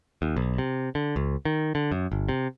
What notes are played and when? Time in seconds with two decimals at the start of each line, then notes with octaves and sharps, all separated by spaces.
0.22 D#2
0.36 B1
0.58 C3
0.95 D3
1.16 C#2
1.45 D#3
1.75 D3
1.92 F#2
2.12 G1
2.29 C3